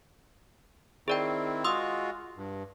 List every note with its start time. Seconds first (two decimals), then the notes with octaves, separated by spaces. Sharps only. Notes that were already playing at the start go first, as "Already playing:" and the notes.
1.08 D#3 C4 E4 G#4 D5 G5
1.64 G#3 F4 F#4 C6 D#6 E6
2.37 G2